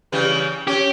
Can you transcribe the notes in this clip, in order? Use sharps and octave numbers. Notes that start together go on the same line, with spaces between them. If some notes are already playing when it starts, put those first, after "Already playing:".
C#3 E3 G3
C#4 G4